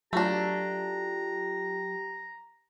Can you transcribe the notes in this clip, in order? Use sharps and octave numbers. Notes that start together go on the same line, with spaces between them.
F#3 A3 D4 F4 G4 A#5